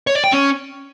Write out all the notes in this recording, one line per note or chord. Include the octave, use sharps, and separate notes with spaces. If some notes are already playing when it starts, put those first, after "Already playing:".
C#5
D5
G5
C#4